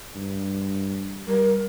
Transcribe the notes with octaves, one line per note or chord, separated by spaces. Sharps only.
G2
G3 A#4